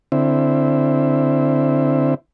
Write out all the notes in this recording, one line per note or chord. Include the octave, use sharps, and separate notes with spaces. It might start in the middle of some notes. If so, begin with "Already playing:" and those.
D3 C4 E4